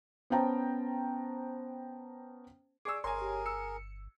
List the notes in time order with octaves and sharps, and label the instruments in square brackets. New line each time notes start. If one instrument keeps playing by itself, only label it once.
[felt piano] B3 C#4 C5 G5 A5 A#5
[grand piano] G#4 E6 [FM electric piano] D5 C#6 D6
[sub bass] G1 [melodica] G#4 A#4 [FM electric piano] C#5 A#5 [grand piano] G#5 C6
[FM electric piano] G4 C#5
[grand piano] E6 [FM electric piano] C#7